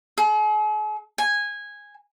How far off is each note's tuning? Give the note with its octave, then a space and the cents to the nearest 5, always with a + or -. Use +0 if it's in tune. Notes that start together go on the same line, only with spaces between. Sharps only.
G#4 +45
G#5 -10